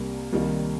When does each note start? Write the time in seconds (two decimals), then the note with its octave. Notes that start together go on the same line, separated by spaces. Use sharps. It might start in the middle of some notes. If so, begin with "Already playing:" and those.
Already playing: C2 C3 G3 A#3
0.32 C2 C3 D#3 G3 A#3